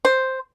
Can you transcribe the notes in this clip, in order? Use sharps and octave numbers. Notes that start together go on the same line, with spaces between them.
C5